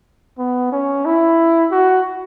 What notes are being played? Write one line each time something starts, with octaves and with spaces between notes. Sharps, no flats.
B3
C#4
E4
F#4